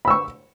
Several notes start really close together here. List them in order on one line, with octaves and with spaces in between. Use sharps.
B5 E6 C#6